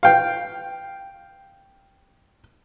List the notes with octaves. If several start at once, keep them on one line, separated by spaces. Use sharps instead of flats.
F5 G5